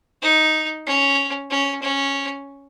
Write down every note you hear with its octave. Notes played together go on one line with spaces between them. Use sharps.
D#4
C#4
C#4
C#4